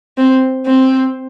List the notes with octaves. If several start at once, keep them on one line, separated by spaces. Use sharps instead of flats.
C4
C4